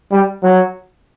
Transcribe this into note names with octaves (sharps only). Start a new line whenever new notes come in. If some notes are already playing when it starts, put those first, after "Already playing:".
G3
F#3